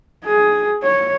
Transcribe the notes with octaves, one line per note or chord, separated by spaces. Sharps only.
G#4
C#5